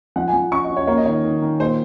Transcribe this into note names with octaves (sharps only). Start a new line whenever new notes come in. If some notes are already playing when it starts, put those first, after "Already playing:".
F3 F#5
G#5
F3
C#4 C#6
D#5
C#4
C#5
A#3 C#5
D#5
D#3 C#5
D#3
D#3
A#2 C5